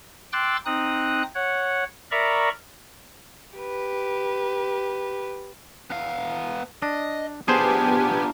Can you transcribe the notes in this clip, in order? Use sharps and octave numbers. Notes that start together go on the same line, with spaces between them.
G5 C6 D6 E6 F#6 A6
C4 D#4 D#6 F#6
C#5 F#5
A#4 D5 E5 A#5 B5 C#6
G4 B4
B3 F5
D4 D#5
B3 D4 F4 G4 G#4 C5 G#5